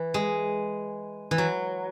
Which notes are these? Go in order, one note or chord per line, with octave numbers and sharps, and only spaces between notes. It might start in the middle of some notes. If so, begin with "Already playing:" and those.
Already playing: E3
G#3
E3
F#3